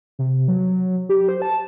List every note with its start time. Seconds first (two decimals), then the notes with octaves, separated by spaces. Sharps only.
0.19 C3
0.48 F#3
1.09 G4
1.29 C5
1.42 A5